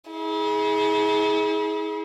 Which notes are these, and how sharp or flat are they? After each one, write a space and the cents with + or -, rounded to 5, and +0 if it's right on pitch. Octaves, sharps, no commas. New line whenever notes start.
E4 -40 G#4 +10